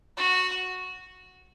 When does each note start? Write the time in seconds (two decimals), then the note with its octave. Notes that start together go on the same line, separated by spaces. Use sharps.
0.17 F#4